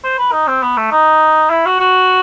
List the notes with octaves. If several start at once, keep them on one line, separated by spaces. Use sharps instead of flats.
C5
B4
D#4
C4
B3
A3
D#4
E4
F#4
F#4